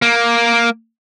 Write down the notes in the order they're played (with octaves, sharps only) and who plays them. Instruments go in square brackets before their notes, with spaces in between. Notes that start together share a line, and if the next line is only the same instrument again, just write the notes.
[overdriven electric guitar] A#3